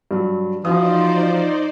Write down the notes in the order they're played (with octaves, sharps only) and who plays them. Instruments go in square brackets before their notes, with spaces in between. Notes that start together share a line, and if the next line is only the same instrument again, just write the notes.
[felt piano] G2 F#3
[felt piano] E3 F#4 D#6 [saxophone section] F3 [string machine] D#4 C5 D5